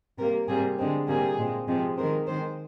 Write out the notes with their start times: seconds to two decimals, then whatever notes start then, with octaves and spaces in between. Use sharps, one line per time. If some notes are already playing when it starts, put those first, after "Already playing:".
0.18 C3 G3 A#3 A#4
0.48 C3 G3 A#3 G#4
0.78 D3 G#3 C4
1.08 C3 G3 A#3 G#4
1.38 A#2 G#3 C4
1.68 C3 F3 G#3 C4
1.97 D#3 G#3 C4 A#4
2.27 D#3 G#3 C4 C5